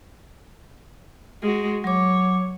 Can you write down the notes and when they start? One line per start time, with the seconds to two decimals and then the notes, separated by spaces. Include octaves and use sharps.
1.42 G#3 F#4
1.84 F#3 C#5 D6